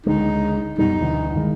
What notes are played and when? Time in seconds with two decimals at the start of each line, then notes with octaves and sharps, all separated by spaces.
0.06 C#2 D3 G#3 D#4
0.78 F#2 B2 G3 D#4
1.01 D2 D3 E3
1.34 G2 D#3 G#3